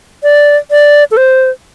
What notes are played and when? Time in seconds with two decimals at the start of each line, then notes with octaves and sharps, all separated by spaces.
0.23 D5
0.71 D5
1.11 A4
1.17 C5